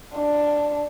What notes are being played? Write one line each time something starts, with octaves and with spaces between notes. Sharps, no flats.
D4